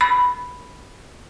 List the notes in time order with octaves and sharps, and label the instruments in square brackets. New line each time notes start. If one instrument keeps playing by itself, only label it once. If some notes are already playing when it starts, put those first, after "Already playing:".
[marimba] B5